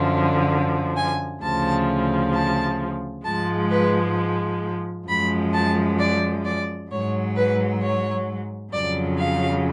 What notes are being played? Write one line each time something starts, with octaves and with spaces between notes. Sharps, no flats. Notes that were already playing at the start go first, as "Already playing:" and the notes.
Already playing: F#2 D3 F3
G#5
D2 C#3 F3 A5
A5
G#2 F3 G#3 A5
B4
F#2 F3 G#3 B5
A5
D5
D5
G#2 F#3 C#5
B4
C#5
F2 C#3 F#3 D5
F5